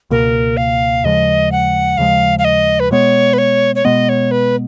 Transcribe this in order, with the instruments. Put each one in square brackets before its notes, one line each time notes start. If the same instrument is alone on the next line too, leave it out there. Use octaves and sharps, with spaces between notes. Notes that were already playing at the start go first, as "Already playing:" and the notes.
[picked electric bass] C#2 B2 A#3 [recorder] A#4
[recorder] F5
[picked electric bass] D#2 C#3 F3 G#3 [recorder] D#5
[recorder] F#5
[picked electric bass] D#2 C#3 F3 G#3 [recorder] F5
[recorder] F5
D#5
B4
[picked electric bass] B2 G#3 B3 [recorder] C#5
[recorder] B4
C#5
C#5
[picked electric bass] B2 G#3 B3 [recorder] D#5
[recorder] C#5
B4